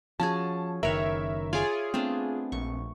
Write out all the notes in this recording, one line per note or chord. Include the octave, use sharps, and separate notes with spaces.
F3 C#4 F#4 G#4 A5
F#1 D#3 A#4 B4 C#5 E5
F4 G#4 C#5 D5 G#5
A3 B3 C4 D4
A#1 C#6